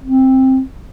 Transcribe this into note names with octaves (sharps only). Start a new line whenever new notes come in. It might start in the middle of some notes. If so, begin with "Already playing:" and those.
C4